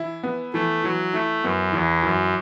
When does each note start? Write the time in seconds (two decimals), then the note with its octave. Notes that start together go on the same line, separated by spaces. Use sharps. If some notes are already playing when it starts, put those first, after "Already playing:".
Already playing: E3 E4
0.23 B3
0.53 E3 A3
0.83 E3 F#3
1.13 A3 E4
1.43 F#2 B3
1.73 E2 E3
2.03 F#2 E3